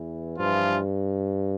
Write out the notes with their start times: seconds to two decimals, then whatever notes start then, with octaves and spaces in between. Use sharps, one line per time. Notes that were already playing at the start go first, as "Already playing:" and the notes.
Already playing: E2 E3
0.38 G2 E3 F3 F4